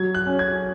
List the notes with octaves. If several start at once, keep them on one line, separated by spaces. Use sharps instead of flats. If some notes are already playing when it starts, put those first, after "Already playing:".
Already playing: F#3 G#6
F#6
C#4
G#6